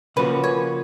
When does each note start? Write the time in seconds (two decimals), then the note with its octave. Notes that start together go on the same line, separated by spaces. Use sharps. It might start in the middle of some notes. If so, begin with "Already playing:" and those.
0.16 C#3 F3 A#3 C#4 F#4 B4
0.44 C#5